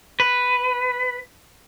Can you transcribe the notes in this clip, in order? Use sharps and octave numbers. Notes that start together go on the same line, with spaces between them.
B4